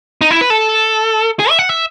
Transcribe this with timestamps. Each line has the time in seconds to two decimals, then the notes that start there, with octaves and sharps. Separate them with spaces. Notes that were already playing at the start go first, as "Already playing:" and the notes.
0.21 D#4
0.31 E4
0.41 B4
0.50 A4
1.39 G#4
1.50 E5
1.59 F#5
1.69 E5